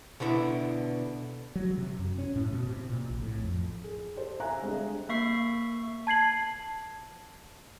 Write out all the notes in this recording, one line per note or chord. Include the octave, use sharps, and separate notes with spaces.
B2 D3 B3 E4
F#3
C3
F#2
C#4
A2
B2
C3
A#2
A#1
A2
F2
G#4
G4 A4 C5
A4 E5 F5 G#5 A#5 F#6
G3 G#3 C4 D4 G#4 D#5
A#3 E5 C#6 C7
A5 G#6 C7 F#7